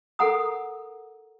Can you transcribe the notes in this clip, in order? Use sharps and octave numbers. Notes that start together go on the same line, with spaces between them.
A4 A#4 F#5 A#5 D#6